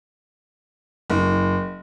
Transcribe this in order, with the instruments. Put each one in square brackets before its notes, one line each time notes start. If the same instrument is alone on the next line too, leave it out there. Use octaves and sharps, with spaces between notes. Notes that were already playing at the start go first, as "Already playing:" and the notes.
[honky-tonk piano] F#1